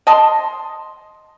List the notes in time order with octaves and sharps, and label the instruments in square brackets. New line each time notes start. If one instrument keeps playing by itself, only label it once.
[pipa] D#5 A5 C6